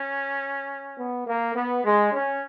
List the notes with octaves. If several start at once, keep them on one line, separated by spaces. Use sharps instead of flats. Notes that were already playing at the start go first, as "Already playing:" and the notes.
Already playing: C#4
B3
A#3
B3
G#3
C#4